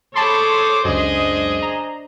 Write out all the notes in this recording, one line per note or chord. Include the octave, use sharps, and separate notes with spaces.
G#4 A4 C5 C#5 A5 B5 C6 D6
C#2 F#2 D4 G#4 C5 D#5
A#5